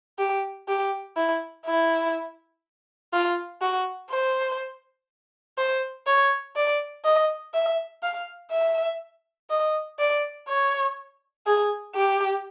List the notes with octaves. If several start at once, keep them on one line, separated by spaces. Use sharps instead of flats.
G4
G4
E4
E4
F4
F#4
C5
C5
C#5
D5
D#5
E5
F5
E5
D#5
D5
C#5
G#4
G4